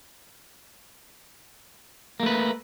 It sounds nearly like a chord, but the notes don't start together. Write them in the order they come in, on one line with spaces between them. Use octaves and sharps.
A#3 A3 B4